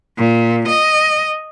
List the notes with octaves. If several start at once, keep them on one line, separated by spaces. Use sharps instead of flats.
A#2
D#5